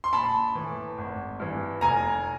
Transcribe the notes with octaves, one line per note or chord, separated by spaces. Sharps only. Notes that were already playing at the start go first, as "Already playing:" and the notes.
C6
A#1 A5 B5
A2 E3
G#1
G2 E3
F1 G#5 A#5